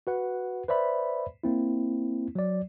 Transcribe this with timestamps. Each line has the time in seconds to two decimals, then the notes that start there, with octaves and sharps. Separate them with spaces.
0.07 F#4 B4 F#5
0.68 B4 C5 D5 E5 B5
1.44 A#3 C4 E4
2.35 F#3 D5